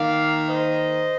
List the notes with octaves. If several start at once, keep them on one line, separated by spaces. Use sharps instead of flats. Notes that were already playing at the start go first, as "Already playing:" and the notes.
Already playing: D#3 A#3 D5 F5
C5 D#5